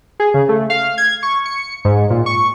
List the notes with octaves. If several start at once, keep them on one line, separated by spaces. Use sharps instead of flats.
G#4
C#3
A3
F5
G#6
C#6
C#7
G#2
A#2
C#6